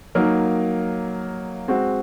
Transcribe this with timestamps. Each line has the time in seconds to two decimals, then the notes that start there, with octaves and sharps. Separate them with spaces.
0.15 F#3 A#3 D#4 A#4
1.68 G#3 C4 F#4